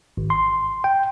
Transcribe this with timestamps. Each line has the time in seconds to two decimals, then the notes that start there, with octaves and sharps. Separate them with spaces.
0.17 G#1
0.30 C6
0.84 G5